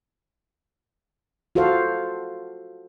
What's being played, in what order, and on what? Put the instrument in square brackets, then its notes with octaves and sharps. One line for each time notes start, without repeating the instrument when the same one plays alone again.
[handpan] F4 F#4 A4 C5 F5